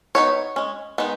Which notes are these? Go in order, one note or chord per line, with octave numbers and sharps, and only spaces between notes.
F#3 B3 D#4 C#5
G#3 C#4
D#3 G#3 B3 D#4